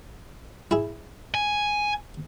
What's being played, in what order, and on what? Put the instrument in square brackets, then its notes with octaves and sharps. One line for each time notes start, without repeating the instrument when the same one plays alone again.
[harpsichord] E4 G#4
[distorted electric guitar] G#5